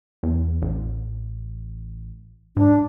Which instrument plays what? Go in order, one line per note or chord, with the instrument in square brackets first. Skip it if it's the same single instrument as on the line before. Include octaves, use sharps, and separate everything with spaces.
[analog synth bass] E2
A1
[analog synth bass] G#2 [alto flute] D4